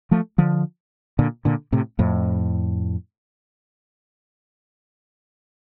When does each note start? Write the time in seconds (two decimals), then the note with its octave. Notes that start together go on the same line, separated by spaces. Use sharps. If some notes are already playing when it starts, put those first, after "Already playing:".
0.11 F3 A3
0.38 D3 F3
1.19 A#2 D3
1.45 A#2 D3
1.72 A2 C3
1.99 F2 A2